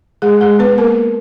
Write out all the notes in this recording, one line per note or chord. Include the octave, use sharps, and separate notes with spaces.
G#3 G#4
G#3 G#4
B3 B4
A#3 A#4